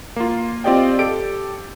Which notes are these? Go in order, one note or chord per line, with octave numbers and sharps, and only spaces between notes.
A#3 F4
C4 F4 G4 D5 D#5 G5
G4 A4 D7